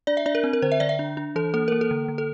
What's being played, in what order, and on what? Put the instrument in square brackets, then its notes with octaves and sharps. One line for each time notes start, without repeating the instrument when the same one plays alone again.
[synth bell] D4 D5
E5
D4 D5
A#4
C4
A#4
D3 C5
E5
D3 D5
E5
D4
D4
E3 A4
A#3 A4
A#3 A#4
A4
D3
D3
A4